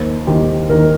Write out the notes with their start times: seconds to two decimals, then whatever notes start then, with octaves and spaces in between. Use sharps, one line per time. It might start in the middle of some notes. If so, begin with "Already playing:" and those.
Already playing: D#2 D#3 C5
0.27 D#2 D#3 G4
0.69 D#2 D#3 A#4